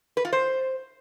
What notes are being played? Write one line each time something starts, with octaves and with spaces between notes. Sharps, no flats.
B4
F4
C5